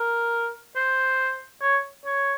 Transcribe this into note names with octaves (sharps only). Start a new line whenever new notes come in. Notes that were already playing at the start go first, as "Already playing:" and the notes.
Already playing: A#4
C5
C#5
C#5